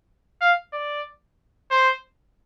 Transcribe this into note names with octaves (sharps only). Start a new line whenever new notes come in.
F5
D5
C5